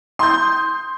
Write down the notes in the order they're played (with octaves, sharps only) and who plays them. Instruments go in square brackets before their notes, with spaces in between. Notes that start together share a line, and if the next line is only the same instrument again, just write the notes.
[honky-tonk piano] C6 D#6 G6